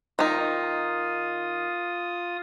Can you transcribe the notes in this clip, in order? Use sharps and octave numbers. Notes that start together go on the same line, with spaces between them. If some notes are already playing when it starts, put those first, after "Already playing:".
D#3 D#4 F4 D#6